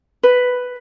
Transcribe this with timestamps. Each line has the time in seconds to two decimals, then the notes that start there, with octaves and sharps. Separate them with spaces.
0.23 B4